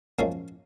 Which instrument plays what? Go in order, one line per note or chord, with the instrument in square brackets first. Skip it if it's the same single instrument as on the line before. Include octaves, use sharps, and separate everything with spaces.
[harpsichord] F#2 F3 G#3 A#3 C#4